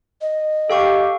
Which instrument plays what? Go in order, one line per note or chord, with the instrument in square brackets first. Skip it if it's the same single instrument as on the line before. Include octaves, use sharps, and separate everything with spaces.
[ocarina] D#5
[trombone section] G4 [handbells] A4 F5 C#6